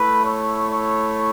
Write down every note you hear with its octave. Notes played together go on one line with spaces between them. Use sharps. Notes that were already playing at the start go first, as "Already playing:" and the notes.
Already playing: A3 E4 B4
C#5
C#5